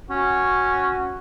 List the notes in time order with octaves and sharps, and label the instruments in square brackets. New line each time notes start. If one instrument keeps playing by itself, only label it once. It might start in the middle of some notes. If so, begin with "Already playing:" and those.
[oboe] C#4 [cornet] F#4